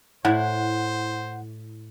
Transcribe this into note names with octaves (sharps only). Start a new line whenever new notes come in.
A2 E4 C5 F#5